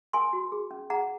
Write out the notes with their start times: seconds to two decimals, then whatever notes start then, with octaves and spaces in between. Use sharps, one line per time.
0.13 A#4 G#5 C6
0.33 F#4
0.52 G#4
0.71 C#4
0.90 G#4 F#5 A#5